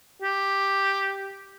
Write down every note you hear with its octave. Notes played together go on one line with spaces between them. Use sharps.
G4